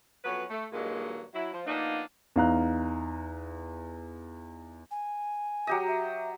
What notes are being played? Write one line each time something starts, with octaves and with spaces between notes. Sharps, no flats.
F2 F#3 B3 C#4 B4
A3
G2 A#2 D#3 F#3 G#3 A#3
F#3 E4
F3
F3 A#3 B3 D4 D#4
E2 D#4 F5 A#5 F#6
G#5
F#3 G4 D#5
E5